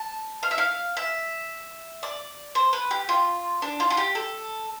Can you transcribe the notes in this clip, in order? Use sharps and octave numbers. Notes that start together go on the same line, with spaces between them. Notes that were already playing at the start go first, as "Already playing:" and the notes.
Already playing: A5
F5
E5
F5
E5
D5
C5
B4
G4
F4
D4
F4
F4
G4
A4